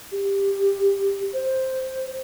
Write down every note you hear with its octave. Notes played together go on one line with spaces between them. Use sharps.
G4
C5